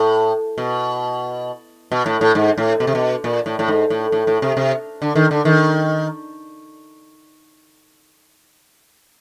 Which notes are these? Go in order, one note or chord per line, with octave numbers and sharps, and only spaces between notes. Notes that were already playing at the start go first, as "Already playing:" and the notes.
Already playing: A2
B2
B2
A2
A2
G#2
A2
B2
C3
B2
A#2
A2
A2
G#2
A2
A2
A2
C3
C3
D3
D#3
D3
D#3